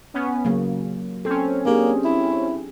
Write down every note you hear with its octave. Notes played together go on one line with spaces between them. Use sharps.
B3 C#4
C#3 F#3 A#3
C4 C#4 A4
A#3 D4 G4 G#4
E4